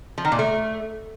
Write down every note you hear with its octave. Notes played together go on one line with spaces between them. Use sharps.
F3
D#3
A#2
A3